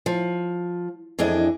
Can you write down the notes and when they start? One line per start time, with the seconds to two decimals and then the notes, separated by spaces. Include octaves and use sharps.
0.06 F3
1.19 F2 E3 D4 G#4 D#5